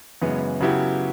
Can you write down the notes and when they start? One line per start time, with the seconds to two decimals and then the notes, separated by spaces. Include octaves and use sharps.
0.22 F#2 C#3 E3 G#3 B3
0.60 C#3 F#3 B3 E4 G4